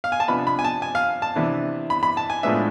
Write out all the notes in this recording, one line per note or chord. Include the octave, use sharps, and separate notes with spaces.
F5
G#5
A5
C3 F3 B3 D4 B5
B5
G#5
A5
G#5
F5
A5
C3 E3 B3 D4
B5
B5
A5
G#5
A2 F3 G#3 B3 D4 E5